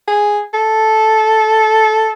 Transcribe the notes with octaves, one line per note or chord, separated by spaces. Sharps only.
G#4
A4